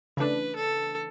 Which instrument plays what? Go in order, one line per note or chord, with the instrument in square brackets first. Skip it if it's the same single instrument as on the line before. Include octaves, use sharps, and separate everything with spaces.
[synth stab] C#3 E3 A3 D4 [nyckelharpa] B4
[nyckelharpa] A4